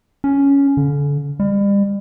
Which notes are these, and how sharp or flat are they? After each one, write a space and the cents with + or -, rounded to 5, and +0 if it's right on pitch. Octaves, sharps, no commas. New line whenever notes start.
C#4 +10
D3 -35
G3 +40